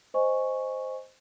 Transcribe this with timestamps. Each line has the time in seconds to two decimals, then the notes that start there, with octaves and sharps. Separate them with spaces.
0.14 C5 D#5 G#5 C#6